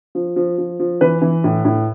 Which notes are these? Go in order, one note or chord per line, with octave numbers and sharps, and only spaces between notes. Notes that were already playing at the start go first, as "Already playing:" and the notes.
F3
F3
F3
F3
E3 B4
E3
A2
A2